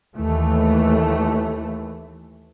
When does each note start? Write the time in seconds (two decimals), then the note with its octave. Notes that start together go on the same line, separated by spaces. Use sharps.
0.16 D#2 E3 A3